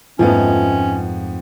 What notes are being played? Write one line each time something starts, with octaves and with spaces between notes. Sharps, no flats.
F2 G#2 F3 A3 B3 C#4